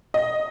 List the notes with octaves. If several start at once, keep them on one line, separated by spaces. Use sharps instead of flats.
D#5